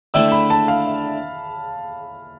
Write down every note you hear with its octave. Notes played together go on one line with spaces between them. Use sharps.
D3 A3 C4 E4 E6
B5
A5
F5
E5